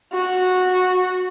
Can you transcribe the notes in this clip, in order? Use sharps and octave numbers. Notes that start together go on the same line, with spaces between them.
F#4